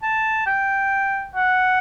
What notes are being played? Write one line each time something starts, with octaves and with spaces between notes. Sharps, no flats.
A5
G5
F#5